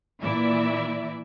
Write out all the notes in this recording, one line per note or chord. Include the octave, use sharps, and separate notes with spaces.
A#2 E3 E4 D5 E5